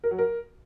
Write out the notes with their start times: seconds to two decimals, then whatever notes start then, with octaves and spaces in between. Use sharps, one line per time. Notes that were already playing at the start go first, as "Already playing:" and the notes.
0.04 A#4
0.11 F#3
0.19 A#4